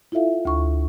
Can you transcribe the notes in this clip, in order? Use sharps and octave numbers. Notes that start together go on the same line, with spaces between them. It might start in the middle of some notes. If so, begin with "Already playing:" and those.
E4 F4 A4 E5 F5
D2 C#6